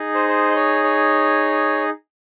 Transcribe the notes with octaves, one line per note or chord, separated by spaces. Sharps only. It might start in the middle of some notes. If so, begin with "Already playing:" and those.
Already playing: D#4 G#4
C5
C5
D#5
C#5
C#5